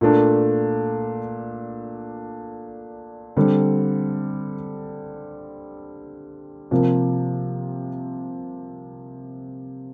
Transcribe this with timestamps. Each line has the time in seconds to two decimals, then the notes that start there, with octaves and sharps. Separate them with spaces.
0.01 A#2 A3 D4
3.37 D3 G3 C4
6.71 C3 F3 A#3